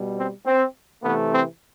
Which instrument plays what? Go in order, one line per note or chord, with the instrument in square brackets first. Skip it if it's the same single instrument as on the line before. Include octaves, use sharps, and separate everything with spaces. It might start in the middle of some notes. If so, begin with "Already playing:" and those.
Already playing: [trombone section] B2 G3
C4
C4
C3 E3 A3 B3
C4